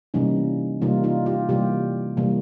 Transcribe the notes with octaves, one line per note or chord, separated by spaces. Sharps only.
C3 E3 G3 A#3 C#4 D#4
C3 E3 G3 A#3 D#4 F4
D#4 F4
F4 G4
C3 E3 G3 A#3 F4 G4
C3 E3 G3 A#3